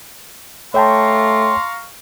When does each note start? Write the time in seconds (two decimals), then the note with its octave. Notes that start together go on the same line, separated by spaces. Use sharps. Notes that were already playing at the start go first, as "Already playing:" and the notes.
0.74 A3 C#5 F5 G5 A5 A#5 C6 C#6